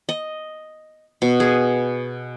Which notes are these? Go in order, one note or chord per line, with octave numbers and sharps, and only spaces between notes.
D#5
B2
G#4